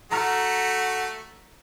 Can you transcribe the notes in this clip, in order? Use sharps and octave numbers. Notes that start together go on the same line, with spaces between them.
A3 F#4 A#5 F6 C#7